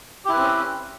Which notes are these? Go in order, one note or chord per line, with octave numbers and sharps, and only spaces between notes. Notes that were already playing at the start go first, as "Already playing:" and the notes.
C4 C#4 E4 G4 B4